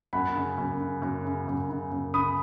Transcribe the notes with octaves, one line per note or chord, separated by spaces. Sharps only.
F#2 F#5 B5
C#3
F#2
C#3
F#2
C#3
F#2
C#3
F#2
C#3 B5 D#6